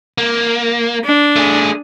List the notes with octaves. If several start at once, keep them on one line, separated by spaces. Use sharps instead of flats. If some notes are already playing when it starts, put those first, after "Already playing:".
A#3
D4
A3 G#4